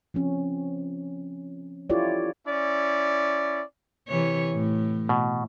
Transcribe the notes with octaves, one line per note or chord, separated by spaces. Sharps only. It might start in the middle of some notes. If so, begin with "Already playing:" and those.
F3 C4 C#4
E4 F4 G4 A4 C#5 D5
C#4 E4 D5
C3 E3 C#5
A2
B2